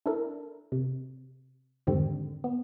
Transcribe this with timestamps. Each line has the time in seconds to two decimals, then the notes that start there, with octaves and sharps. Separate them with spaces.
0.06 D4 E4 A4 A#4
0.72 C3
1.87 F2 G#2 D3 D#3 G3 C4
2.44 B3